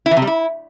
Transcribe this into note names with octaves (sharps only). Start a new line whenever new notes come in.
E4
E3
C3
G3
E4